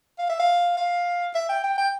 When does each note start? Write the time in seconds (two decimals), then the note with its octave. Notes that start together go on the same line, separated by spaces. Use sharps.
0.19 F5
0.29 E5
0.40 F5
0.77 F5
1.35 E5
1.49 G5
1.64 G5
1.78 G5